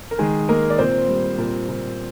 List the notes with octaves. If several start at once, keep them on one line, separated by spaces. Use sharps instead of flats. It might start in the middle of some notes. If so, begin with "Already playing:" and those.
A#4
D#3 G#3 G#4
G#3 A#3 A#4
D5
A#2 C4 C5
G3
A#2
A#2